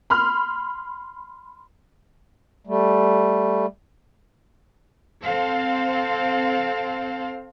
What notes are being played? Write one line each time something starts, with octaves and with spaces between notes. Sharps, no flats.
B5 C6 F6
G3 A3
C4 A4 C5 F5